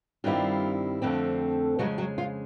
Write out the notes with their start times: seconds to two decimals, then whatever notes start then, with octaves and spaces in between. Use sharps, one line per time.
0.24 G2 D#3 G3 C4 E4 F4
1.02 F2 D3 F3 A3 C4
1.79 F2 C#3 F3 F#3 G#3 F#4
1.98 F#3 F#4
2.18 F4